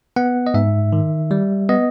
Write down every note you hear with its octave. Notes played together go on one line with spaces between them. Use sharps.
B3 F#5
D#5
G#2 E5
D#3
G3
B3 D#5